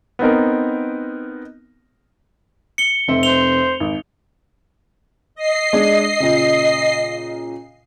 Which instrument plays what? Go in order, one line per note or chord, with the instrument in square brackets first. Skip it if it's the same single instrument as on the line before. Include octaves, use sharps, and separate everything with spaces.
[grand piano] B3 C4 D#4 A#4
[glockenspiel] C#7 G7
[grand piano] F1 C4 E5
[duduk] C5 [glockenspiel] F7 G7
[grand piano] G#1
[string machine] D#5 C7
[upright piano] G#3 D4
A#2 C#3